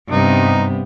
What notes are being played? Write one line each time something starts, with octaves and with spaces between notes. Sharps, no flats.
G2 C3 B3 D#4